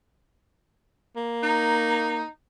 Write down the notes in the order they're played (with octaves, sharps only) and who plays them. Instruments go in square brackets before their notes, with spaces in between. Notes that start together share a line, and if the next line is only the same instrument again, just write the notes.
[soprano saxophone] A#3
[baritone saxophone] D#4